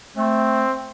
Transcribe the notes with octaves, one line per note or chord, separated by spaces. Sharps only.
A3 C4